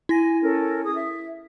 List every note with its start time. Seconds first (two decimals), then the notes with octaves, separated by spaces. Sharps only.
0.09 E4 G#5 A#6
0.42 C#4 A4 A#4
0.85 G#4 D#6
0.97 E5